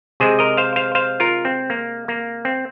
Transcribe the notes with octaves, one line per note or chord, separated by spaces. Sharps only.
C3 G#3 G#4 C5
A#4 D#5
C5 F5
C5 F5
C5 F5
F4 A#4
C4
A#3
A#3
C4